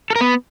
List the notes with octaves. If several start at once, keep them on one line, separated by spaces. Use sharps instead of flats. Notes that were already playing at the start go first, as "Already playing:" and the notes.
A4
A#4
B3